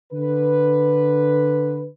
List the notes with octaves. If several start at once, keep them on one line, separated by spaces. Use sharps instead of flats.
D3 B4